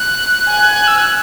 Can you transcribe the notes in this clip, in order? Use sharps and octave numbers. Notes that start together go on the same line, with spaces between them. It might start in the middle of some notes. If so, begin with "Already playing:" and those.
Already playing: F#6
G#5
E6
F#6